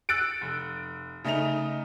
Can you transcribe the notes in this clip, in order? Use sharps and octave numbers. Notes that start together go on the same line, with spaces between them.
E6 F#6 A6 C#7 D7
F1
C#3 A3 D#4 D#5 F7